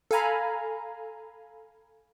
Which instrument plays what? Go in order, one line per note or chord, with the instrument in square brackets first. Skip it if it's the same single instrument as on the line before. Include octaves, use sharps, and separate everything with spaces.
[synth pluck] A4 F5 G#5 A#5 B5